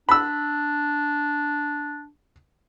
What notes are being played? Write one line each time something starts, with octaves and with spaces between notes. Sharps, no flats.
D4 B5 E6